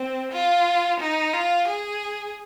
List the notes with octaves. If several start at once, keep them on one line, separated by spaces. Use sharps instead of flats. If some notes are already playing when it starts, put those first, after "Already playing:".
Already playing: C4
F4
D#4
F4
G#4